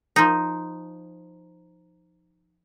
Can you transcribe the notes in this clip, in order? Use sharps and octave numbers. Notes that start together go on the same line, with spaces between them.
F3 D#4